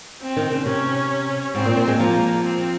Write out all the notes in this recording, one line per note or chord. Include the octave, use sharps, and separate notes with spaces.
C4
D#3
C#3
C3 C#4
G#2 C4
A#2
A#2
G#3
F3 A#3
C4